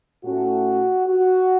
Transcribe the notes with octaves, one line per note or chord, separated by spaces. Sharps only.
A2 A3 C#4 F#4
F#4